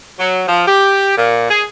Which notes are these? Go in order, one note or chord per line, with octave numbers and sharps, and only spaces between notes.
F#3
F3
G4
A#2
G#4